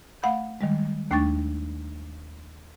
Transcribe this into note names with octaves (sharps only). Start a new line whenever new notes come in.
A3 F5 F#5 B5 G6
D#3 G3 G#3
D#2 A3 D4 G5 C#6 A6